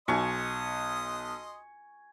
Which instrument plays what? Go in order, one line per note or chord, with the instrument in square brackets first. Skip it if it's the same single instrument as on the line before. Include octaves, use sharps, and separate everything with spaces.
[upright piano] B1 [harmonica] D#5 C6 D#6 [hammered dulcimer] G#5 C#6